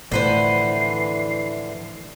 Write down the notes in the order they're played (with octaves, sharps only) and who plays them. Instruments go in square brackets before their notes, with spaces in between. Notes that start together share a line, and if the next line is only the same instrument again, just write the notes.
[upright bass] A2 F3 [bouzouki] D3 B4 C5 [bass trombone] E3 [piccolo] C7